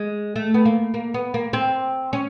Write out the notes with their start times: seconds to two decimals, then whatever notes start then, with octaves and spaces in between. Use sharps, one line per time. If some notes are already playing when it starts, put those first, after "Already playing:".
Already playing: G#3
0.36 A3
0.54 B3
0.65 A#3
0.94 A#3
1.14 B3
1.34 A#3
1.53 C4
2.13 C#4